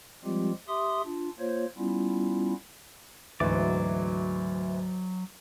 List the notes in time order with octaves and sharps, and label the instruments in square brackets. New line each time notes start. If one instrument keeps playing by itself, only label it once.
[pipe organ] F3 G3 G#3 C4 F4 G4
G4 E5 C6 D#6
D4 F4
A#3 F4 C5 C#5
G3 B3 C#4 E4 F4
[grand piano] D2 G#2 E3 [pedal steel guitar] F#3 D5